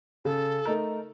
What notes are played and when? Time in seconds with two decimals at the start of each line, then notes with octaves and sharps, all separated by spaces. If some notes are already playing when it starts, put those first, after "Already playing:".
0.25 C#3 A4
0.65 A3 D#4 A#4